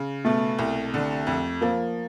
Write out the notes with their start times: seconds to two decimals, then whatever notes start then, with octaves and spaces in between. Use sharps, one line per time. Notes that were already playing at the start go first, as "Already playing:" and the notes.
Already playing: C#3
0.25 B2 A3
0.59 C2
0.94 D3
1.27 F2
1.61 F3 A#3